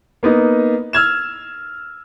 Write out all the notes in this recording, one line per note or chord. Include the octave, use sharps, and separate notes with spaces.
A#3 B3 D#4
E6 F6 G#6 E7